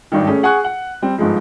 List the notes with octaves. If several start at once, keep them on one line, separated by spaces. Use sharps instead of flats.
G#1 G2 D#3
A3 C#4 G#4
G#4 F#5 G#5 C#6 F#6
F#5
G3 C4
G1 G#2 F3 G#3